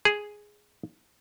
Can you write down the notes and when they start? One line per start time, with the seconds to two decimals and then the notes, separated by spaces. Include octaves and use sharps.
0.05 G#4